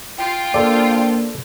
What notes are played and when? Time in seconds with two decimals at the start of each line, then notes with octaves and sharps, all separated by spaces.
0.18 F4 G5
0.54 A#3 D4 A4 C5 D5